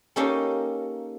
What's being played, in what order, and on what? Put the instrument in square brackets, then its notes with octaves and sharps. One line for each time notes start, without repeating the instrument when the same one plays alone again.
[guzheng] A#3 C#4 D#4 G4 A4